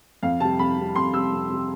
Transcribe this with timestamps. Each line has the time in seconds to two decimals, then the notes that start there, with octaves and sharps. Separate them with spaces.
0.23 F2 F5
0.40 C3 G3 A5
0.59 F2 B5
0.78 C3 G3
0.95 F2 C6
1.14 C3 G3 E6
1.32 F2
1.50 C3 G3